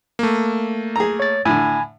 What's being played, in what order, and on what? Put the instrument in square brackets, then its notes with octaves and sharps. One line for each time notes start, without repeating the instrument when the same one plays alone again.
[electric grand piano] A3 A#3
[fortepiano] G#4 A#5
[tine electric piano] C#5 A6
[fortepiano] A2 D3 [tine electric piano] G#5 B5